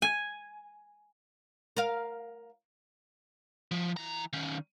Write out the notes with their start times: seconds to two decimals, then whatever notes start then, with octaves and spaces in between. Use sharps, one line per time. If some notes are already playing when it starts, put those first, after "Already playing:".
0.02 G#5
1.77 A#4 F5
3.71 F3
3.97 E3 A#5
4.33 D#3 C#4